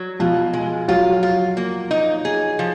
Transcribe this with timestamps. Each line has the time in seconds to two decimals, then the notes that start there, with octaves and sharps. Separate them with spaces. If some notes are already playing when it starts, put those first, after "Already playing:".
Already playing: F#3
0.20 B2 F3 F4
0.53 G#3
0.88 F#3 F4 F#4
1.23 F4
1.57 A#3
1.91 D#4
2.25 G#4
2.59 F3